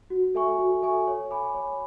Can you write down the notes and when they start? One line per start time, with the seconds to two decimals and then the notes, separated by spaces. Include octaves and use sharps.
0.10 F#4
0.35 A4 E5 G#5 C#6
0.58 F#4
0.82 A4 E5 G#5 C#6
1.07 C#5
1.31 G#5 B5 D6
1.54 C#5